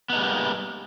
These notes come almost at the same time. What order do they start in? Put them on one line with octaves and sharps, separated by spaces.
B3 D#4 G#3 G3 A#3